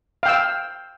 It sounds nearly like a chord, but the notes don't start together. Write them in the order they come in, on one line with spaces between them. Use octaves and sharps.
F5 G5 E6